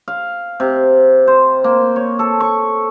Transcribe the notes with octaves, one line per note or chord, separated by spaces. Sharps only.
F5
C3
C5
A#3
C#5
A4
C#6